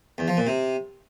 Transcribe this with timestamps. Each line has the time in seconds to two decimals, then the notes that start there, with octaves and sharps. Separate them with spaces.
0.18 E2
0.28 F3
0.37 A#2
0.47 C3